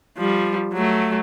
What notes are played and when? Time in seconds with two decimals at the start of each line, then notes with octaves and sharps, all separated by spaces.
0.17 F3 G3
0.73 F#3 A3